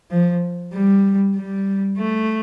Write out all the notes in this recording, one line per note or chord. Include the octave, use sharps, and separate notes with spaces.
F3
G3
G3
A3